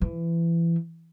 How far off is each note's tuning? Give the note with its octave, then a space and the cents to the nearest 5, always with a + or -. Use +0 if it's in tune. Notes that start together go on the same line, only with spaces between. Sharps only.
E3 +25